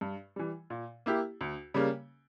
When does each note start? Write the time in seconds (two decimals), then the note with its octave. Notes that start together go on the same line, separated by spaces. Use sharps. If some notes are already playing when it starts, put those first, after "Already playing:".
0.01 G2
0.36 E3 G3
0.70 A#2
1.06 A#3 E4 G4
1.41 D2
1.74 C#3 G3 A#3